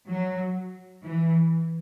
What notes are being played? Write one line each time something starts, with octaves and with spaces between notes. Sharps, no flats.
F#3
E3